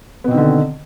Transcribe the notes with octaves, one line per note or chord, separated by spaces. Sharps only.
B2 D3 D#3 B3 C4